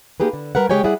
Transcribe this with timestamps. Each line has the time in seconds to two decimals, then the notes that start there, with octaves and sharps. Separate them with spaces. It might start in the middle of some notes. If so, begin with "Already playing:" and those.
0.20 A#3 D#4 G4 G#4 B4
0.33 D3
0.55 G3 A#4 B4 F#5
0.70 C#3 G#3 G4 C#5 G5 G#5
0.83 G3 E4 G#4 D5 F#5